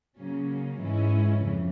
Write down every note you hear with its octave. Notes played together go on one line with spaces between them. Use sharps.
C#3 F#3 A#3 C#4
G#2 E3 G#3 C#4 E4
F2 C#3 E3